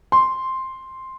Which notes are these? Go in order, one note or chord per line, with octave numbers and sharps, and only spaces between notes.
C6